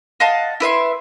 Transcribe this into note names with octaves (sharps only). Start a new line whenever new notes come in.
D#5 F5 F#5 A5
E4 B4 E5 C6